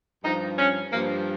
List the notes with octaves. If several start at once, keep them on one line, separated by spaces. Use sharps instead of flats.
G2 F3 D#4
C#4
G2 F3 A#3